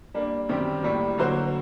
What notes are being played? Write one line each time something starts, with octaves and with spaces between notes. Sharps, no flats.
G3 A#3 D4
F#2 D#3 G3 C4 G4
A2 G3 A#3
D3 F#3 A#3 F#4 C5